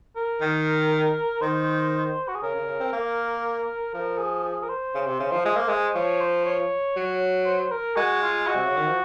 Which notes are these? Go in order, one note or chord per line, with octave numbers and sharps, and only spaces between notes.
A#4
D#3
D#3 C5
F#4
G#4
C#3 A#4
C#3
C#3
C4
A#3
F3 A#4
G#4
G#4
A#4
C5
C#3
C3
C#3
F3
G#3
A#3
G#3
F3 C#5
C5
C#5
F#3
C5
A#4
G#3 F#4
F4
F#4
C3
C#3
D#3
F3